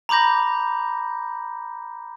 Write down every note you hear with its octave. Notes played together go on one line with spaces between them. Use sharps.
A#5 B5 D6 G6 A#6